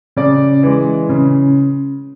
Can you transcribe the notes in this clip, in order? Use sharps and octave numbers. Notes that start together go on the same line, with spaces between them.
C#3 D5
E3 G#3
C#3